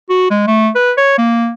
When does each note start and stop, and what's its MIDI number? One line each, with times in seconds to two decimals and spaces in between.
0.10 0.29 66
0.30 0.42 56
0.47 0.69 57
0.75 0.92 71
0.97 1.16 73
1.18 1.50 58